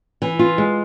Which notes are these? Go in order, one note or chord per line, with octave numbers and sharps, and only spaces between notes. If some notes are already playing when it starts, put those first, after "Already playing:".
E3
F4
G#3